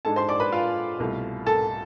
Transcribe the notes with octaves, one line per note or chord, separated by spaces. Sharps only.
G#2 G#3 D4 A4 A5
C5 C6
D5 D6
B4 B5
F4 F5
C2 B2 A3
A4 A5